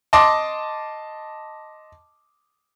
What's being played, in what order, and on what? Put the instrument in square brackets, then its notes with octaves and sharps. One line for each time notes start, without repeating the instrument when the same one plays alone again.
[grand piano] D#5 A5 C6 D6